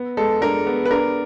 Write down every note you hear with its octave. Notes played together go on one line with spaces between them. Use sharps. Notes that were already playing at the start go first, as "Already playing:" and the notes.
Already playing: B3
G#3 A4
D4 A#4
B3
B4
D4 A#4